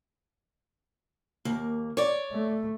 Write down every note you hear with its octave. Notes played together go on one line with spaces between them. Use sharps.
D#2 A#3
C#5 D5
A3